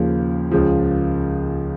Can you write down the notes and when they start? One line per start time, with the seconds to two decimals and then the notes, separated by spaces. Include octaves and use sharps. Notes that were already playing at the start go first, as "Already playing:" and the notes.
Already playing: D#2 C#3 F3
0.51 C#2 C#3 F3